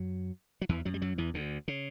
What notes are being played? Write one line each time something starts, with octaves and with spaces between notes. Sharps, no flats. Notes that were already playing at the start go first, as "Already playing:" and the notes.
Already playing: F#2 F#3
F#3
E2 E3
F#2 F#3
G3
F#2 F#3
E2 E3
D2 D3
C#3